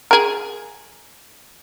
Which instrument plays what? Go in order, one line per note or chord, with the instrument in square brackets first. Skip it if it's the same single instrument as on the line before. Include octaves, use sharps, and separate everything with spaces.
[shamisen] G#4 A#4